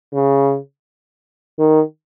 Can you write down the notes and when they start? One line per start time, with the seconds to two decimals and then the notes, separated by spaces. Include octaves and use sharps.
0.13 C#3
1.59 D#3